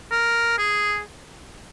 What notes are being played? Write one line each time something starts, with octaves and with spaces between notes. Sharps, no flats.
A#4
G#4